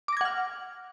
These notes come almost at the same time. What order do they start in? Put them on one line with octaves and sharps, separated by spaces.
D6 A#6 G#6 F#5 F6